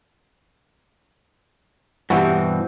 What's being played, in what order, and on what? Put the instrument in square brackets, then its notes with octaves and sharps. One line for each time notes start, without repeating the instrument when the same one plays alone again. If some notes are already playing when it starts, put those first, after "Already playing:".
[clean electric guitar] G2 B2 C4 [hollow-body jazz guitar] E3 [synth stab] F#4 G4